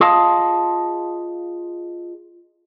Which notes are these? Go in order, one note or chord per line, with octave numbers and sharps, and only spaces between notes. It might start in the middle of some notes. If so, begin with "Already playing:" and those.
F4 G#4 D#5 F5 A5